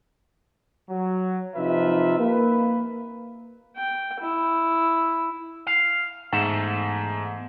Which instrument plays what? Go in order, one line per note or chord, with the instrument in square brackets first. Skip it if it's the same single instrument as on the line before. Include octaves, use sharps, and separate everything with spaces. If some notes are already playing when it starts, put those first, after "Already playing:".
[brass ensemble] F#3
C3 F3 D#4 F4 B4 E5
A#3 B4
[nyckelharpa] G5
E4
[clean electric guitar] F5
[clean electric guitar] E2 A3 E5 [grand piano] G#2